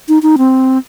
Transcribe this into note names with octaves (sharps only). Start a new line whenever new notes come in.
D#4
D#4
C4